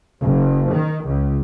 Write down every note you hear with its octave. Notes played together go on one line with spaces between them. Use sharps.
F#1
D#3
C#2